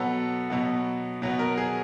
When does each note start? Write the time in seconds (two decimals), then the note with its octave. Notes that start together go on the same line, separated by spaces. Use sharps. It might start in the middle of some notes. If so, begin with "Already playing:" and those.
Already playing: B2 F#3 B3 A4
0.50 B2 F#3 B3
1.22 B2 F#3 B3
1.39 A#4
1.58 G#4